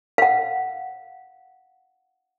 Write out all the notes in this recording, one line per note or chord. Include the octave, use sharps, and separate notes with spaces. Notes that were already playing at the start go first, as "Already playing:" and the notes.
F5 F#5